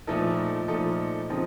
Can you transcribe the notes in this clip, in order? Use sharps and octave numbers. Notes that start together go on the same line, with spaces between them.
A#2 F3 A3 D#4 A4
A#2 F3 A3 D#4 A4
C#3 F3 C4 D#4